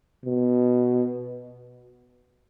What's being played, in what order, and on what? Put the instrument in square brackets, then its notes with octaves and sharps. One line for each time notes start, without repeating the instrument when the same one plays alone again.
[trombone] B2